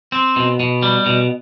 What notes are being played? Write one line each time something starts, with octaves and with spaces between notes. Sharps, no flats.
C4
B2
B2
G3
B2